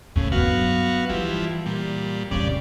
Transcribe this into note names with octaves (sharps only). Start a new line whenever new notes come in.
D#2 A2 C#3
G2 F#3 B3 F#4 F5
E3 F3 G3 E4
A#2 G3
F1 A#2 C#3 G3 D5